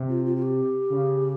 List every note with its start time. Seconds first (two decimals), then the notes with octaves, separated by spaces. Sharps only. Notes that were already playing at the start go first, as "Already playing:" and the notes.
Already playing: C3
0.09 F4
0.25 F4
0.36 F4
0.42 G4
0.90 C#3